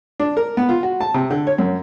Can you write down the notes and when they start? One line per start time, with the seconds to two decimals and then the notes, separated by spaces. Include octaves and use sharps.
0.20 D4
0.37 A#4
0.57 B3
0.69 F4
0.83 F#4
1.00 A5
1.14 C3
1.30 D3
1.47 C#5
1.58 F#2